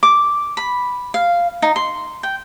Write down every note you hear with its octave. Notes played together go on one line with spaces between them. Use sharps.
D6
B5
F5
D#4
C6
G5